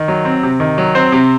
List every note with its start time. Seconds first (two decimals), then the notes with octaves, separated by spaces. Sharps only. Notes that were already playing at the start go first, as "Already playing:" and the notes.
Already playing: D#3
0.08 F#3
0.25 C4
0.43 C3
0.60 D#3
0.78 F#3
0.95 C4 C5
1.12 C3